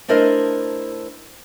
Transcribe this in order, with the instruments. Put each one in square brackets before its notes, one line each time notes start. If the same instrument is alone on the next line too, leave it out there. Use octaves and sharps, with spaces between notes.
[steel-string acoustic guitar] A3 D4 E4 A#4 C5 D#5